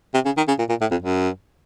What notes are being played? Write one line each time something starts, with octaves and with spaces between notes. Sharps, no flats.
C3
C#3
D#3
C#3
A#2
A#2
A2
F2
F#2